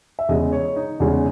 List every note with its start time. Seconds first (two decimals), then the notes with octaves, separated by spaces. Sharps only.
0.19 E5
0.29 E2 C#3 G#3 D#5
0.52 C#5
0.76 D#4
1.00 E2 C#3 G#3